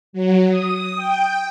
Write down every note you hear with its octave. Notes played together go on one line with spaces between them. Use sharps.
F#3
D#6
G5